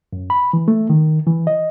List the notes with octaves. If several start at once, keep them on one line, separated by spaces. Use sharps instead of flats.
F#2
B5
E3
A3
D#3
E3
D#5